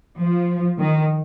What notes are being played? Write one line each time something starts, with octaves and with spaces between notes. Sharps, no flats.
F3
D#3